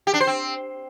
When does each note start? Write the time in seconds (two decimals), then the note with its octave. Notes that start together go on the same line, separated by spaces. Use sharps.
0.07 G4
0.14 D4
0.20 C5
0.27 C4